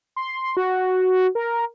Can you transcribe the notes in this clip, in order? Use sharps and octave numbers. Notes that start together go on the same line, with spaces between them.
C6
F#4
A#4